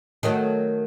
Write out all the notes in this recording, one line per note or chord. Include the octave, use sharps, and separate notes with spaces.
D#3 F#3 A3